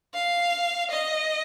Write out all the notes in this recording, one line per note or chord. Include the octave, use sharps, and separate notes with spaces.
F5
D#5